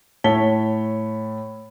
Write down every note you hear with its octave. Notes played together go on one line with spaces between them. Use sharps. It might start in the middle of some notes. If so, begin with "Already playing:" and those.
A2 C#5 A5 B6 G7